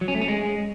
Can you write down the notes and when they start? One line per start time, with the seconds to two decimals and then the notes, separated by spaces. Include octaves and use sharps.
0.01 F#3
0.08 C#4
0.15 A3
0.21 C#4
0.28 G#3